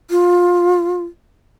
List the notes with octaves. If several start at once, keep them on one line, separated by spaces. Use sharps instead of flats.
F4